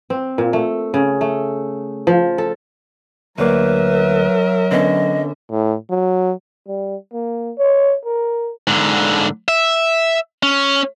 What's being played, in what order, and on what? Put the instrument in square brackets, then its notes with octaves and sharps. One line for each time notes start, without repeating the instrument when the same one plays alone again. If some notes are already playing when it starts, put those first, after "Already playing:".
[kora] C4
A#2
A3
C#3
A3
F3
A4
[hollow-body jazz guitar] D2 A#3 [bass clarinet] F#3 [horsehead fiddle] A#4 E5 [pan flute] B4
[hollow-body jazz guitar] D3 B3 C#4 [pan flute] D#5
[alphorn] A2
F#3
[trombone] G3
A#3
C#5
A#4
[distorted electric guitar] G#2 D3
E5
C#4